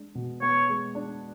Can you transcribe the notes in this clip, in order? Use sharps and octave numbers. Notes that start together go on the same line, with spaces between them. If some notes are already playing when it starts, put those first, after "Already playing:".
Already playing: G#3 D4
B2
B3 C#5
G#3
D4